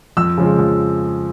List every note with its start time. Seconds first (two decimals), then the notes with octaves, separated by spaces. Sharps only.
0.17 F2 E6
0.38 C#3 F3 G#3
0.59 F2